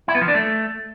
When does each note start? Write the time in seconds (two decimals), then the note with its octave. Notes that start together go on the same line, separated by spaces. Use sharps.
0.08 E4
0.15 B3
0.21 F3
0.28 D4
0.35 A3